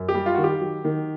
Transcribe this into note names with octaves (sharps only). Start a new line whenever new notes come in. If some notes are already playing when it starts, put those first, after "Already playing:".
Already playing: F#2
G4
G3
F4
D#3 F#4
G4
F#3
D#3